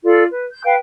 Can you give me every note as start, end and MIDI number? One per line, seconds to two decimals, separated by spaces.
0.04 0.23 65
0.04 0.23 69
0.04 0.23 74
0.31 0.43 71
0.50 0.64 91
0.64 0.75 71
0.64 0.75 77
0.64 0.75 79